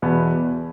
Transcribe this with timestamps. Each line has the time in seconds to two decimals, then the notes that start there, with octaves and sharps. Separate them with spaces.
0.02 E2 B2 B3